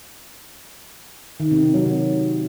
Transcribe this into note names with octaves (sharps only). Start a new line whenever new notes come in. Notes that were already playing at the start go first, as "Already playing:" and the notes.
D#3
C3
C3
F#3
C3